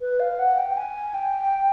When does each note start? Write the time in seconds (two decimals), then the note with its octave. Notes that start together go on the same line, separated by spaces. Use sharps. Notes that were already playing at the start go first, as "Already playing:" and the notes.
0.01 B4
0.20 F5
0.39 F#5
0.58 G5
0.77 G#5
1.14 G5